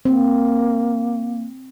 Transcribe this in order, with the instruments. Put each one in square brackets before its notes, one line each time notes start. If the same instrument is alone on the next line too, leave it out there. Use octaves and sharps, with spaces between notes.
[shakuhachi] A#3 [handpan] C4